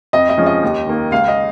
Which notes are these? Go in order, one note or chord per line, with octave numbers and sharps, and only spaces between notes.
F2 D#5
D#5
F3 G#3 C#4
D#5
D#2
D#3 A#3
C#2 F5
D#5